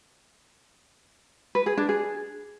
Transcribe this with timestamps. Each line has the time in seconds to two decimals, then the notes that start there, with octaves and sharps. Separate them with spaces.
1.55 B4
1.66 G#4
1.77 D4
1.89 G#4